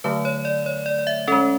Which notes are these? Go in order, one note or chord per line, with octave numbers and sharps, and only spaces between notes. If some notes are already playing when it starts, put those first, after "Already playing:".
D3 F#3 A3 B4
C#5
D5
C#5
D5
D5
E5
G#3 C#4 A4